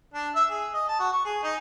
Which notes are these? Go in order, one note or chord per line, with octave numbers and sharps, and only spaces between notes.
D4
E5
G#4
D#5
A5
F#4
C#6
G#4
D#4